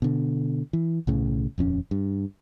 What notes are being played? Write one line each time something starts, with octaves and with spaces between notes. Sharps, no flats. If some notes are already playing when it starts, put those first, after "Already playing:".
B2 D3
E3
B1 A2 C#3
D#1 F2 C4 C#4
G2